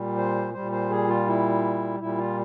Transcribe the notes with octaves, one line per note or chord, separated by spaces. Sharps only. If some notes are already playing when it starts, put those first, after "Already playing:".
Already playing: A#2 G3
C5
A#2 G3 C5
C5
G#4
F4
E4
A#2 G3 E4
F4